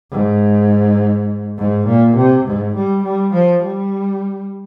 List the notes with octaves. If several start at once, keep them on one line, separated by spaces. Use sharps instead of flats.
G#2
G#2
A#2
C3
G#2
G3
G3
F3
G3